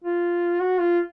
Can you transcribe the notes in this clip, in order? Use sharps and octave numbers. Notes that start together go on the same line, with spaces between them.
F4
F#4
F4